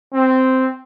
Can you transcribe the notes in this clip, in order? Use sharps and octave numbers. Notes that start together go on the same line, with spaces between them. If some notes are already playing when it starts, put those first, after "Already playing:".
C4